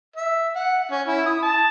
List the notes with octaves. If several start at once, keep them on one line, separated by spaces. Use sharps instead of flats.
E5
F#5
C#4
E4
D#6
A5